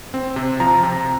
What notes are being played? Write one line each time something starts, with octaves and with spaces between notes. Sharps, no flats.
C4
C3
F3 A#5
C3